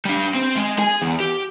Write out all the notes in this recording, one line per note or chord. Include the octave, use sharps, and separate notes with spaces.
G3 D4
C4
G#3
G#4 G#5
E2
G4